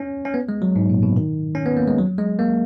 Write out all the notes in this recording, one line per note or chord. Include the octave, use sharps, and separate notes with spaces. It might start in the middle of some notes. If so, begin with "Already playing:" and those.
Already playing: C#4
C#4
B3
G#3
F#3
G#2
A#2
B2
D#3
C#4
B3
A#3
G#3
F#3
G#3
A#3